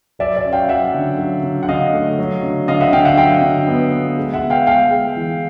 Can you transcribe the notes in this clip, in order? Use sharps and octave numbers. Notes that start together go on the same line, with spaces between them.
F#3 D5 E5
D5 E5
C#4
F5 G5
F#3 E5 F#5
D3
F#3
D3
F#5
D3 D#5 F5
A3
F#3
D3
D3 D#5 F5
E5 F#5
D3 F5 G5
E5 F#5
F#3 F5 G5
D3
B3
B3
G#3
E5 F#5
B3
F5 G5
G#3 F5 G5
G#3
E3